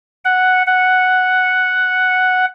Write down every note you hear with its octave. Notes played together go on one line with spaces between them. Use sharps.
F#5
F#5